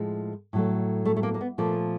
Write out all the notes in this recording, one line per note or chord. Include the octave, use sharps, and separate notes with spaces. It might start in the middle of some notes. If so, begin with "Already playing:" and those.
Already playing: A2 F3 G#3
A2 F#3 A3
A3
A3
A#3
A#3
B3
A#2 F3 A3 A#3